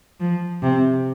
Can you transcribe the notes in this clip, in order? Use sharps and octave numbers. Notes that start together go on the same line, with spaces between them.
F3
C3